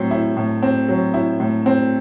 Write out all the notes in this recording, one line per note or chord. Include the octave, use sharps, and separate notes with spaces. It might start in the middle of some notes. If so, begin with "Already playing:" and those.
Already playing: A2 F#3 C4
E4
A2
C4
F#3
E4
A2
C4